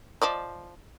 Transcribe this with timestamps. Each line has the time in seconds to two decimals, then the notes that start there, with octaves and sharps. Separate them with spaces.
0.22 F3 D5 D#5